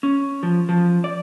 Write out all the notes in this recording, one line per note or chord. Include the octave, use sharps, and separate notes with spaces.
C#4
F3
F3
D5